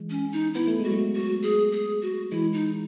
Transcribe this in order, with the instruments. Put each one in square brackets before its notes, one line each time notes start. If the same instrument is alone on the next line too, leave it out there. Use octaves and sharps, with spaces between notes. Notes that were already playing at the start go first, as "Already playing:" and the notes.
Already playing: [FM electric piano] E3 G#3
[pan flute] C#4
D#4
[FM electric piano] B3 [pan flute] E4
[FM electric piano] A3
[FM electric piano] G#3 [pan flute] F#4
[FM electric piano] F#3 A3
[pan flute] F#4
G#4
G#4
F#4
[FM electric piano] E3 G#3 [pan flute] E4
[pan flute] D#4